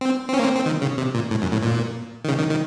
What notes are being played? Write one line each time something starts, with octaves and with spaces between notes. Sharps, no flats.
C4
C4
C#4
A#3
C4
C4
D#3
C#3
C3
A#2
A2
F#2
A2
A#2
D#3
C#3
D#3
D#3